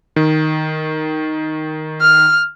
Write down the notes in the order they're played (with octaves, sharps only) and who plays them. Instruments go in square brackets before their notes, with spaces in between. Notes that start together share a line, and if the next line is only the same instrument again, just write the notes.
[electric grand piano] D#3
[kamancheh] F6